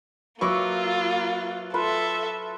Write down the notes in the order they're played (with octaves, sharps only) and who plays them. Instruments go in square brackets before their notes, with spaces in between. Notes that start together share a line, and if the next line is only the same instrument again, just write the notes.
[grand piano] F#3 C#6 [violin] A#3 F4 [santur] B4 E5 D6
[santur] F4 B4 B5 [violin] A4 E5